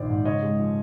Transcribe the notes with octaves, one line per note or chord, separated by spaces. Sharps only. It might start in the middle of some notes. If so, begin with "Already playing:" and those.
Already playing: A#1 D#3 C5 D5
G#2
C#3 C#5 D#5
G#3
F3